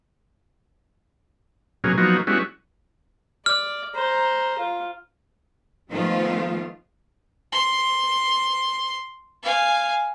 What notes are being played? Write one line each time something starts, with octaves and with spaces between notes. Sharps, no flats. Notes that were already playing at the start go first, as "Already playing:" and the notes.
B2 F#3 A#3 C#4 G#4
F3 F#3 A#3 B3 D#4 F#4
G3 G#3 B3 C#4 E4 F#4
D5 F6
C5 A#5
F4
D#3 F3 G#3 A3 B3 F4
C6
F5 G#5